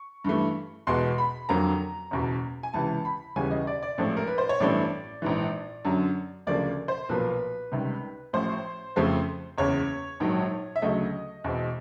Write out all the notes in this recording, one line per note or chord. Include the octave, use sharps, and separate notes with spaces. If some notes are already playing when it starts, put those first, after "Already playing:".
Already playing: C#6
G2 E3 A3
E2 B2 G#3 B3 C6
B5
F2 D3 F#3 A#3 A#5
F#1 E2 B2
G#5
C#2 C3 E3 A5
B5
D#2 C#3 E3 G3 B3 G#5
D#5
D5
D5
A1 G#2 F3 A3 C4
A#4
B4
C5
C#5
A1 G2 E3 A3 C4 D5
A#1 G#2 E3
F#2 D3 F#3
D2 C#3 F3 A#3 D5
C5
B1 A#2 F3 A#3 B4
C#2 C3 D#3 G3
A1 A2 F3 C5
F2 C#3 F3 A3 C4
F#1 E2 C#3 C#5
A#1 G#2 D#3 F#3
E5
D2 C#3 F#3 A3 D#5
E2 B2 G#3 C4